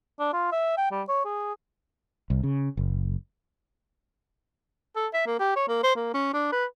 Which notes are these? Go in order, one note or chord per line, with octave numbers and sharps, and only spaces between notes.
D4
F4
E5
G5
G3
C#5
G#4
C2
C#3
F#1
A4
E5
A#3
G4
C#5
A#3
C5
A#3
C#4
D4
B4